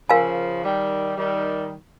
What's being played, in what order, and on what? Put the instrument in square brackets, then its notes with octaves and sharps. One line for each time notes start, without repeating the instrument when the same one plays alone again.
[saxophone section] C#3 F3 [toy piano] A#4 F5 G#5
[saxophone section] D#3 G3
D#3 G3